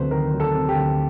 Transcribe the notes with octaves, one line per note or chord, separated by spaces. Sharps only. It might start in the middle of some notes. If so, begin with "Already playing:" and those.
Already playing: D2 C3 F#3 B4 C5
D#3 A#4
F#3
A4
C3
G4
D2